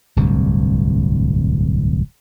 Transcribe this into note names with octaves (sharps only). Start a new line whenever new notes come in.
D1 C2 G2